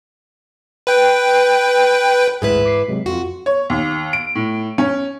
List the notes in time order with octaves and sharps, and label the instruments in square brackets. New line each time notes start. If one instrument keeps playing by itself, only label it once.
[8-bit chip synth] B4 G5
[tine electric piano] A1 D2 G#4 [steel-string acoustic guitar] G#2 E4 B4
[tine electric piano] D6 B6 C7
C3 F#3 G#3
[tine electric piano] F2 F4 [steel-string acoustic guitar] F#4
[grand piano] C#5
D#2
D7
A2
C#4